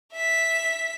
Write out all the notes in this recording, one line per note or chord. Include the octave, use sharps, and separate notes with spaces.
E5 B6